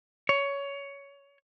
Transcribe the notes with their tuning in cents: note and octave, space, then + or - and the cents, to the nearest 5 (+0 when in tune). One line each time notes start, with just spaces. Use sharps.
C#5 +15